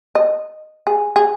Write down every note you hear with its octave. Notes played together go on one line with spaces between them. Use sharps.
D#5
G#4
G#4